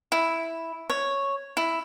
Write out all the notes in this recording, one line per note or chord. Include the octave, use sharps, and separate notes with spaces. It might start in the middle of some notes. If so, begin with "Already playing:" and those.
E4
C#5
E4